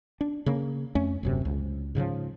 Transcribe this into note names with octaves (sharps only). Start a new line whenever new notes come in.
D4
C#3 A#3
F2 A3 C#4
D#1 F#2 C3
C#2
G#2 C#3 E3 F3